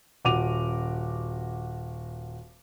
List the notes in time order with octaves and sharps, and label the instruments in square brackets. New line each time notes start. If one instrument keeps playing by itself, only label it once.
[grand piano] D#1 F#4 D6 D#7 F7